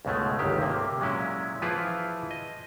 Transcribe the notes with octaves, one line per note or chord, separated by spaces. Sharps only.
C#2 G#2 B2 G#3 A3
G1 C#2 D#3 G4
C3 A#3
A#2 F#3 G#3 C#4 E4
E3 F3 E4 F4 G#4 B4
D#5